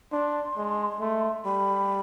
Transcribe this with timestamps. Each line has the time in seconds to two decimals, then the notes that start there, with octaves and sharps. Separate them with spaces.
0.12 D4 C6
0.57 G#3
1.00 A3
1.45 G3 B5